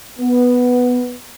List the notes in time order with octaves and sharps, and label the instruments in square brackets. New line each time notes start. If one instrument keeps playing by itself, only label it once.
[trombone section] B3